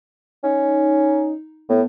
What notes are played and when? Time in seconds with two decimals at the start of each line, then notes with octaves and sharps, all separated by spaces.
0.44 C#4 D#4
1.70 A2 B3